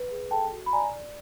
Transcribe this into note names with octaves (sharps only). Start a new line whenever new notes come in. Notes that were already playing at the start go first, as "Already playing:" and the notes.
Already playing: B4
G#4
A4 G5 A5
F#4
B5
D5 G#5 A#5
D5